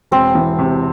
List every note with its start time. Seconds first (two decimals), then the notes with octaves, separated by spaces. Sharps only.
0.11 E1 C4
0.35 E3
0.59 C3